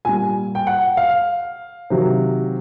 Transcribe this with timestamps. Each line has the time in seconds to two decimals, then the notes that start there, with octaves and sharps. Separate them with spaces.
0.05 A#2 G3 G#5
0.55 G5
0.67 F#5
0.97 F5
1.90 C3 D#3 F#3